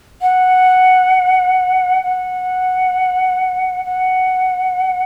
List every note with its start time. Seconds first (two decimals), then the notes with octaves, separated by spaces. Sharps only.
0.21 F#5
2.04 F#5
3.85 F#5